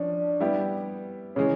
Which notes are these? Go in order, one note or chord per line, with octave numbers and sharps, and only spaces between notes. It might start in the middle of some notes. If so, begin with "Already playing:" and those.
Already playing: F3 C#4 D4
G3 B3 E4 G4
C#3 E3 G#3 C#4